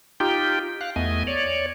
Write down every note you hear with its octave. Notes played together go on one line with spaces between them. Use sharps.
D#4 F4 G4 G5
F5 F#6
E2 A3 B3 D#5 G#5
C#5 D5